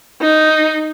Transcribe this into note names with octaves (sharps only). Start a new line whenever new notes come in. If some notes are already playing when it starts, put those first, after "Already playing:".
D#4